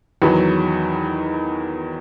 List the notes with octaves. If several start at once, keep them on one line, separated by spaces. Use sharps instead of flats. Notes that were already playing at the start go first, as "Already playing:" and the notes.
E2 D#3 F#3 B4